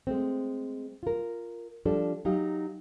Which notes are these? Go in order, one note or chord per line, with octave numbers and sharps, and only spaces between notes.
G#3 A3 C4
F4 A#4
F3 G3 D4 A4 D5
F#3 D#4 G4 F5